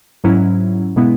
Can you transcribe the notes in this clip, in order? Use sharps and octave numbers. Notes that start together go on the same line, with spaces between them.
G#2 F#3 C#4 E4
B2 G#3 B3 E4